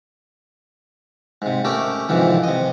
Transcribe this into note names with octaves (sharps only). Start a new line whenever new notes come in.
G#2 C3
A3 C#4 G4 A#4
F2 G#2 C3 D#3 E3
C3 D#5